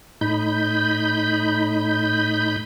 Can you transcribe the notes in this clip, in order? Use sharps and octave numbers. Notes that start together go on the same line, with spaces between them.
A2 D#4 B5 G6